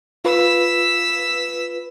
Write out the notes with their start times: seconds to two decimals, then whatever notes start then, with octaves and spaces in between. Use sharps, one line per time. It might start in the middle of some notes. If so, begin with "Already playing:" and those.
0.25 F4 B4 E6 B6